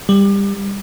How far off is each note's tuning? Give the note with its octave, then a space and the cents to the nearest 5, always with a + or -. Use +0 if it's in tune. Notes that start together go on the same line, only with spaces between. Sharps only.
G3 +20